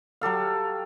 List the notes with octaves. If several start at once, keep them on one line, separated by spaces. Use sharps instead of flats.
F#3 G4 A4 F5